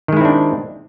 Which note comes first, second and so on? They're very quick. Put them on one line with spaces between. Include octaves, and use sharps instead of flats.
D#3 G#3 E4 C4 D4